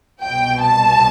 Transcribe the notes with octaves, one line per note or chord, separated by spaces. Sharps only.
C2 B2 G5
A5